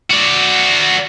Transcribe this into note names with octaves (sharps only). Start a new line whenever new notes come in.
F#4 D5